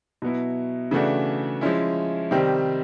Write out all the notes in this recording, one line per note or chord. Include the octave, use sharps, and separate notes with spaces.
B2 F#3 B3 E4
C#3 E3 A3 D4 F#4
F3 G#3 C#4 E4
C3 D#3 G3 C4